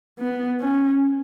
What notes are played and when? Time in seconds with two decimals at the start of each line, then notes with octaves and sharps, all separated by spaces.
0.19 B3
0.60 C#4